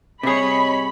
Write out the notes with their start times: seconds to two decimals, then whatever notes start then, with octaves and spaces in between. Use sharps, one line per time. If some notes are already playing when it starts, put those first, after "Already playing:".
0.23 C3 G3 G#4 C#5 D#5 B5